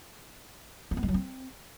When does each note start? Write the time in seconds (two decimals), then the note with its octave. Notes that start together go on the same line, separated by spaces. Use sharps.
0.91 A#3
0.97 B3
1.03 G#3
1.08 F#3
1.14 C4